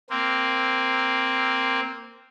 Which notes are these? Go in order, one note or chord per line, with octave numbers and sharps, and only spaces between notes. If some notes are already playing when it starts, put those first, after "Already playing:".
A#3 C4